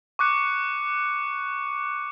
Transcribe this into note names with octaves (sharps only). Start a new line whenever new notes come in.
C#6 D6 F#6 C#7